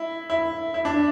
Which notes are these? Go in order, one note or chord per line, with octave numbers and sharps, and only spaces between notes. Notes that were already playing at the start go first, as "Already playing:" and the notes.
Already playing: E4
E4
E4
D4